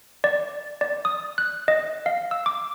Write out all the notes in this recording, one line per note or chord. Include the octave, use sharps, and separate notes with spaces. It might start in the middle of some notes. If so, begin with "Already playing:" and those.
D5
D5
D#6
F#6
D#5
F5
E6
D6